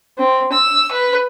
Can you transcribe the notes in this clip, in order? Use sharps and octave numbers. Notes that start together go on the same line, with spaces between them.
C4
E6
B4